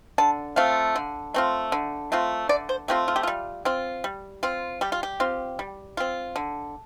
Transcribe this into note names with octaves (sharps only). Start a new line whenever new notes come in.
D3 A5
A3 C4 F4 F5
D3
A3 C4 F4
D3
A3 C4 F4
D3 D5
C5
A3 C4 F4 G4
F4
G4
G3 F4
C4 F4
G3
C4 F4
G3 G4
F4
G4
C4 F4
G3
C4 F4
D3